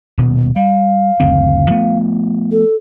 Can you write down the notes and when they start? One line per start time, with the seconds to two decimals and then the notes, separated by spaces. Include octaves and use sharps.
0.18 D#1 B2
0.56 G3 F5
1.20 F#1 D2 C4
1.70 F3 A3 B3
2.52 A4